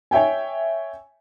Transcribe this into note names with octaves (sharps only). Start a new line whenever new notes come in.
C#5 E5 G5 G#5